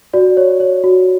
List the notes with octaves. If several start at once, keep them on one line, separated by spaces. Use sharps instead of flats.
F#4 D5
C#5
C#5
F#4